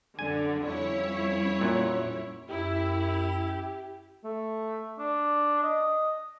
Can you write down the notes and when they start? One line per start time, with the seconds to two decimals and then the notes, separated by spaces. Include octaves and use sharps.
0.19 F#2 D3 G#5
0.64 F2 G3 C#4 E4 C#5
1.61 A#2 F#3
2.49 F#2 E4 G4
4.24 A3
4.99 D4
5.63 D#5